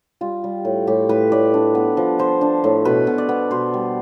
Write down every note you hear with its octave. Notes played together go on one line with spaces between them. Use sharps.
G3 F4
G3
A2
A2 G4
A2 B4
A2 D5
D4
B3
F3
F3 C5
D4
A2
B2 B4
B2
D5
B3
B2 C5
G3